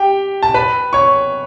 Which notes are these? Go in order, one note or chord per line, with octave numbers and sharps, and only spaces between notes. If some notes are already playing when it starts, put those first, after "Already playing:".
Already playing: G4 G5
A5
B4 B5
C#5 C#6